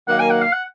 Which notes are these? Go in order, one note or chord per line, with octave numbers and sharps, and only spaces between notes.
D#3 F#3 A#3 F#5
G#5
F#5
F5
F#5